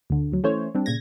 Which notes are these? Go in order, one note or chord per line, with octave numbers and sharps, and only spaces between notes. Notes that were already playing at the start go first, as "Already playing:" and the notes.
D2 D3
D2 F#3
E3 A3 C#4 C5 C#5
G3 C4 D4
A#2 C#3 G#6 A#6